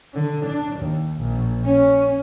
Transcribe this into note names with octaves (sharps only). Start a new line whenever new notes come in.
D3
D4
D#2
A#1
C#4